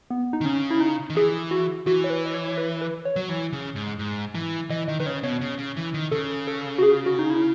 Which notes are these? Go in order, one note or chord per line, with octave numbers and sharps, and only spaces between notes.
B3
D#4
D#3
C#3 C#4
E4
D#4
D#3
E3 G#4
F#4
E3 F#4
C#5
B4
D#5
C#5
C#5
B4
B4
C#5
F#3
E3
C#3
G#2
G#2
E3
E3 D#5
D#3 D#5
D#3 B4
C#3 C#5
B2 C#5
C#3
C#3
E3
D#3
C#3 A4
A4
F#4
G#4
F#4
D#4
E4